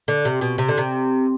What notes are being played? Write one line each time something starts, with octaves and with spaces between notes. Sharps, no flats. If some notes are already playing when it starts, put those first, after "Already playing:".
D3
C3
B2
C3
D3
C3